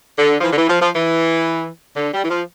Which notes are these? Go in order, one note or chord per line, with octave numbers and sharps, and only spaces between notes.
D3
F3
E3
D3
E3
F3
F3
E3
D3
G3
E3
F3